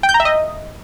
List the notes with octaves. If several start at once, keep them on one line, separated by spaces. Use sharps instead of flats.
G5
G6
A#5
E5
D#5